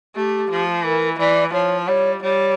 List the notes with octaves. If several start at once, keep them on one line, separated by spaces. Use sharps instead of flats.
A3 G4
F3
E3 A#4
E3 D5
F3 C#5
G3 C#5
G3 C#5